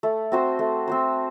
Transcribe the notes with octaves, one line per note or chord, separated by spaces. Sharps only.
A3
C4 F#4 C5
A3
C4 F#4 C5